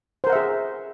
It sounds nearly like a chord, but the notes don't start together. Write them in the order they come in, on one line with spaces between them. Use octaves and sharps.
C5 A#4 F#5 E5 G#4